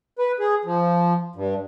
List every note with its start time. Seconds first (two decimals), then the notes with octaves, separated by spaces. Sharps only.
0.19 B4
0.40 G#4
0.65 F3
1.36 G2